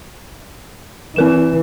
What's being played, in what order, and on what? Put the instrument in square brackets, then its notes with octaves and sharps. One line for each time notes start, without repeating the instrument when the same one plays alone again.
[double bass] E3 [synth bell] C4 A#4 E7